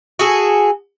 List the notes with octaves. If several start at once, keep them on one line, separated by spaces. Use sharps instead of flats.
F#4 G#4 A4